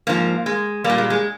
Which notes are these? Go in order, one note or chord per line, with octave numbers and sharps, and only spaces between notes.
G#2 F3 A#3
G#3
G3 A#3
A#2
G#3
G#3